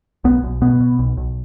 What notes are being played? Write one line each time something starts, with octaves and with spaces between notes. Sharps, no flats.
B1 B3
B1
B2 B3
B2
B1
B1